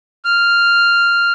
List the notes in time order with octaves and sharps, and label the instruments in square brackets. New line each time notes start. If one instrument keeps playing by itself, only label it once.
[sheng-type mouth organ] F6